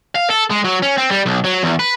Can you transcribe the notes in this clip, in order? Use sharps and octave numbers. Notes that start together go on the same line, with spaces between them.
F5
A4
G#3
F#3
C#4
C4
G3
B1
F#3
E2
B4